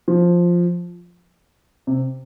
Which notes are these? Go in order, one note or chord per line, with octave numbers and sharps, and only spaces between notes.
F3
C3